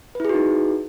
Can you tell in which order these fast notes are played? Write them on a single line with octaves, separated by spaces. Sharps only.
B4 E4 G#4 F#4 D#4